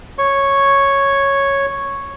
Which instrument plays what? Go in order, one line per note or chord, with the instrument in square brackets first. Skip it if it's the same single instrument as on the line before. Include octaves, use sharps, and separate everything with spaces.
[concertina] C#5 C#6